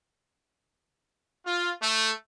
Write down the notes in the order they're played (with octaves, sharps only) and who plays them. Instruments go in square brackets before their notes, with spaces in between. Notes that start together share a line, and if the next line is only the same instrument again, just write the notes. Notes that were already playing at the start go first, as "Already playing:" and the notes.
[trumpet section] F4
A3